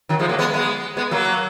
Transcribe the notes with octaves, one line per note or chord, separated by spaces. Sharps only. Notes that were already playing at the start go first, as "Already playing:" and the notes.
D#3 F#3
F3 G#3
F#3 A#3
G#3 B3
G#3 B3
G#3 B3
F#3 A#3